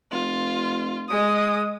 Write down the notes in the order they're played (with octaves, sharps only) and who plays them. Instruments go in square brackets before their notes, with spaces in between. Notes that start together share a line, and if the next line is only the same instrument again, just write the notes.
[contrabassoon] F1 [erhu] F4
[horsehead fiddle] G#3 [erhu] D#6